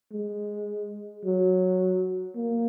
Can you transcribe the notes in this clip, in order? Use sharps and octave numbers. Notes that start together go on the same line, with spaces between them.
G#3
F#3
A#3